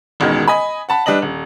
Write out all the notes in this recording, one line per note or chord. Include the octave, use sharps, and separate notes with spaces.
E1 A1 B2 D#3 G#3
D#5 G#5 B5
F#5 A5 B5
G3 D4 B4 D#5 F#7
D#1